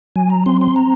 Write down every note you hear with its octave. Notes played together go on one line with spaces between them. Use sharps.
F#3 G#5
A#5
C4 C6
C6
A#5